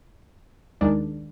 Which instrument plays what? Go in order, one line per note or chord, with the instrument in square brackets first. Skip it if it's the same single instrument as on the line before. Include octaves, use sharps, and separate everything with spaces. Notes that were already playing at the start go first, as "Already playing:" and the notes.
[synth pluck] D#2 D#3 G#3 D4